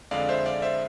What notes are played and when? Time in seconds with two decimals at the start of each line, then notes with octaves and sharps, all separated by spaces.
0.11 F2 D3 G#3 D5 F5
0.29 C5 E5
0.46 D5 F5
0.62 C5 E5